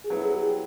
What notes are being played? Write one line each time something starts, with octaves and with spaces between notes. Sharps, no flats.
G#4
F#3 B3 E4 A4
G#4
G4
G#4
G4